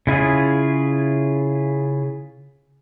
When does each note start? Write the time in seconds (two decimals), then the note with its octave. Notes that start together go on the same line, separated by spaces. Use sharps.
0.07 C#3 E4 F4 G#4